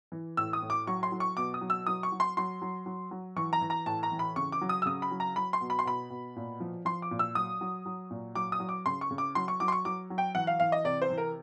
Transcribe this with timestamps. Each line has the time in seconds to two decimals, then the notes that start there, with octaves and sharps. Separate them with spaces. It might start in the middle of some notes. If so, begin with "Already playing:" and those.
0.12 E3
0.37 A2 E6
0.53 D#6
0.62 A2
0.70 D6
0.87 F#3 C#6
1.03 C6
1.12 F#3
1.20 C#6
1.37 B2 D6
1.54 D#6
1.61 F#3
1.70 E6
1.86 F#3 D#6
2.03 C#6
2.12 F#3
2.20 C6
2.37 F#3 C6
2.62 F#3
2.86 F#3
3.11 F#3
3.36 E3 C#6
3.53 A#5
3.61 E3
3.70 A#5
3.86 A2 A5
4.03 A#5
4.12 E3
4.19 B5
4.36 C#3 C#6
4.52 D6
4.61 F#3
4.69 D#6
4.82 E6
4.86 C#3 D#6
5.02 B5
5.11 F#3
5.20 A#5
5.36 F#3 B5
5.53 C6
5.61 B2
5.70 B5
5.79 C6
5.85 B2 B5
6.10 B2
6.36 A#2
6.60 F3
6.85 F3 C6
7.02 D6
7.11 A#2
7.19 E6
7.35 F#3 D#6
7.61 F#3
7.86 F#3
8.11 A#2
8.35 F#3 D6
8.52 D#6
8.60 F#3
8.69 D6
8.86 C#3 C6
9.01 C#6
9.11 C#3
9.18 D6
9.35 F#3 C6
9.48 C#6
9.60 F#3 D6
9.68 C6
9.72 C#6
9.85 F#3 D6
10.10 F#3
10.18 G5
10.35 E3 F#5
10.47 F5
10.60 E3 F5
10.72 D#5
10.84 C3 D5
11.02 C5
11.10 E3
11.18 A#4